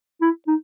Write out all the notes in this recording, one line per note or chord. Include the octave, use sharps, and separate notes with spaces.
E4
D#4